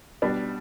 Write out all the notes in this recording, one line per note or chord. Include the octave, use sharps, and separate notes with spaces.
B2 G3 D4